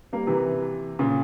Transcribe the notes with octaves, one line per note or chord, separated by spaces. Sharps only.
G3 A#3
C3 E3
A#2 C#3